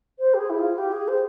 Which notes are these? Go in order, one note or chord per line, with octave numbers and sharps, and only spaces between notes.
C5
G4
G#4
E4
F4
G4
G#4
C5